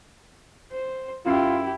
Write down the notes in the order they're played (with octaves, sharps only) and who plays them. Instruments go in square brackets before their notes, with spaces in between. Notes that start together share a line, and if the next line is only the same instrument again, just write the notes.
[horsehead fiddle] C5
[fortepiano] F#2 [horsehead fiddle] E4 G4 [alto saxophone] F4